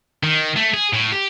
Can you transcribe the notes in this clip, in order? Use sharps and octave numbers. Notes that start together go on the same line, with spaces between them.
D#3
A3
G#4
A2
G4